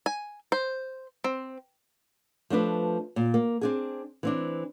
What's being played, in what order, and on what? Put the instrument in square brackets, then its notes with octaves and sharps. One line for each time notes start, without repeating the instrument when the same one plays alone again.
[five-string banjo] G#5
C5
C4
[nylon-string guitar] F3 A3 D4 B4
A#2
A#3
C4 D4 G#4
E3 C4 D4